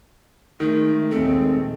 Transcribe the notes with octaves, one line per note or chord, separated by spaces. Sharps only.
D#3 G#3 A3
A#1 D#2 G#3 A3 C4